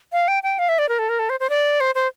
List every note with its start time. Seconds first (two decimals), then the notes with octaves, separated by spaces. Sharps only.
0.13 F5
0.28 G5
0.43 G5
0.59 F5
0.69 E5
0.79 D5
0.89 A#4
0.99 A4
1.09 A#4
1.19 A4
1.30 C5
1.40 C5
1.50 D5
1.80 C5
1.95 C5